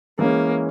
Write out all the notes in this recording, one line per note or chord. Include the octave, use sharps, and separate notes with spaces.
E3 G#3 A#3 C#4